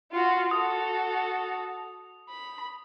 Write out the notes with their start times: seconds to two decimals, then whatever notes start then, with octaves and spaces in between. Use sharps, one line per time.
0.11 F4 F#4
0.51 F#4 A4 D#6
2.30 B5